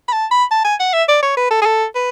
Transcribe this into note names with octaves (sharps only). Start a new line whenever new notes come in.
B5
A5
B5
A5
G#5
F#5
E5
D5
C#5
B4
A4
G#4
A4
B4